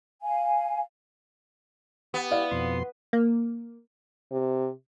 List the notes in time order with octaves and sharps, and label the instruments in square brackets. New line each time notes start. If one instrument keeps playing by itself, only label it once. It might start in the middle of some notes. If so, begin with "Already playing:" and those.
[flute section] F5 G#5
[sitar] B3 [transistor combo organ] G4
[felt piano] E4 D5 F5
[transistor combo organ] F2 B2 C6
[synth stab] A#3
[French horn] C3